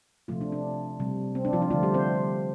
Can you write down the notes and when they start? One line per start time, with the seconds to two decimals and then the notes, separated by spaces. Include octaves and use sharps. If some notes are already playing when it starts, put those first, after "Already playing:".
0.28 C3 F3 A3 F4
0.41 D4
0.52 D4
1.00 C3 G3
1.35 C4
1.45 D4
1.53 F3 F4
1.62 D4
1.70 D3 F3 A3 F4
1.83 G3 G4
1.94 C4 C5